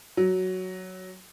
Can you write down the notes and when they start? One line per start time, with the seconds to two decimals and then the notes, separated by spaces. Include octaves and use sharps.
0.17 F#3